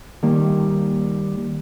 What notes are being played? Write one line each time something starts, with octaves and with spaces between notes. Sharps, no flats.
D#3 G3 A#3